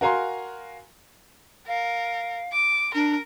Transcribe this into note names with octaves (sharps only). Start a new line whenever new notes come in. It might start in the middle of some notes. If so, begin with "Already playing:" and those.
F#4 A#4 F5 G#5 A#5 C6
A#4 F5
D6
D4 A#4